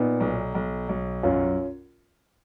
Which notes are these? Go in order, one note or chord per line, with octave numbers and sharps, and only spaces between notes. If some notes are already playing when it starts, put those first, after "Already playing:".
Already playing: A#2 B3 D#4
B1
B1
B1
F#2 C#4 F4